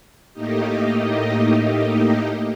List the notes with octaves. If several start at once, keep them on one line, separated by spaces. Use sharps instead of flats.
A2 A3 A#3 D#4 G4 D#5